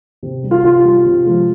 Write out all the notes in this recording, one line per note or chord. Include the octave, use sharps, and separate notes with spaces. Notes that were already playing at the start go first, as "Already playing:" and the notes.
C3
G3
F4
C3 F4
G3
C3
F3 G#3